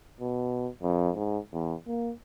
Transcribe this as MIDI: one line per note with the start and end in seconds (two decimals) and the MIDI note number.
0.20 0.68 47
0.82 1.10 41
1.15 1.38 44
1.53 1.74 40
1.87 2.12 58